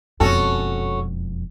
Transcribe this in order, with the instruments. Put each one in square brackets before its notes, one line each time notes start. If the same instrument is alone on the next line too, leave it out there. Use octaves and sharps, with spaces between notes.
[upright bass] E1 F2 [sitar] C#4 F#4 A4